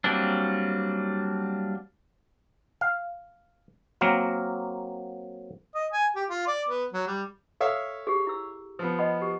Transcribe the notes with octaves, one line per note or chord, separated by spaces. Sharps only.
F#3 G3 A#3 C4 D4
F5
F#3 A#3 C4 A#4
D#5
G#5
G4
F4
D5
B3
F#3
G3
A4 C#5 E5 F5
G4 G#4
E4 E6
F3 B3
D#5 F#5 B5
G4